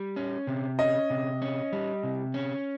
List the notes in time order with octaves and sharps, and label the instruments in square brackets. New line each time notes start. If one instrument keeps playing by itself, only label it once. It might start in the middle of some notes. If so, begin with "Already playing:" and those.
Already playing: [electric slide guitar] G3
C#4
C3
[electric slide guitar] C#4 [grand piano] D#5
[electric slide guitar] C3
C#4
G3
C3
C#4